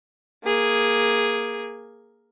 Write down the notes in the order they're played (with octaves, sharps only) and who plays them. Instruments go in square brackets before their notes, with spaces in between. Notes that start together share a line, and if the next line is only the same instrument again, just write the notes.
[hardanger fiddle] A#3 G#4